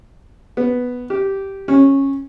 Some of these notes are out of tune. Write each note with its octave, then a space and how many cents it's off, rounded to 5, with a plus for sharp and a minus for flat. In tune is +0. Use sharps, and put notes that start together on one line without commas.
B3 +0
G4 -10
C#4 -15